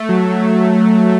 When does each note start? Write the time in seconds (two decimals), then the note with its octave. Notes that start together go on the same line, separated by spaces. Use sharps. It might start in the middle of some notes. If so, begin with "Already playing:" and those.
Already playing: A3
0.09 F#3
0.30 F#3